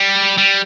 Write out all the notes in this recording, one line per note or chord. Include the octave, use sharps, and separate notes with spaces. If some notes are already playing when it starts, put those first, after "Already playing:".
Already playing: G3
G3